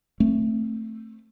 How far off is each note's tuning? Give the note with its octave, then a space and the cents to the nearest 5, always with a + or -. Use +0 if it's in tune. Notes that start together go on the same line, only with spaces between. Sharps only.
A3 +10 C4 +20